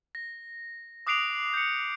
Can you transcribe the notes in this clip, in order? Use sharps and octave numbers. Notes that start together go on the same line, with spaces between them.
A#6
D6 D#6 F#6 C7 D7 F7
G6 C#7